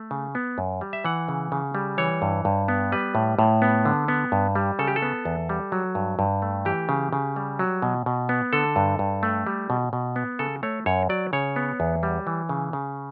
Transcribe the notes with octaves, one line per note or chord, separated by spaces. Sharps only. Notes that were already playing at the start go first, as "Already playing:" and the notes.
Already playing: A3
C#3
B3
F#2
G3
E5
E3 F#5
C#3
C#3
G3
E3 C#5
G2
G2
B3
G3 B4
A2
A2
B3
D3
B3
G2
G3
C#3 A4
G4
A4
B3
E2
G3
F#3
G2
G2
A3
E3 G4
C#3
C#3
G3
F#3
B2
B2
B3
D3 A4
G2
G2
A3
G3
B2
B2
B3
C#3 A4
A3 C#5
F#2 C#5
F#3 D5
C#3 C#5
B3
E2
G3
E3
C#3
C#3